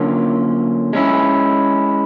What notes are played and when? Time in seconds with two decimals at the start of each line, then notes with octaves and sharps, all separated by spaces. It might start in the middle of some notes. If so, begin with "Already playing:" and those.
Already playing: D3 F#3 A#3 C#4 F4
0.93 G#3 C#4 E4